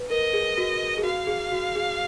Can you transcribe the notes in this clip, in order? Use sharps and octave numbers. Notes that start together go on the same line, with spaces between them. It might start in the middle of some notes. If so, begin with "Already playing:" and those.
Already playing: B4
A#4 D#5
G#4
F#4
G#4
F#4 F5
G#4
F#4
G#4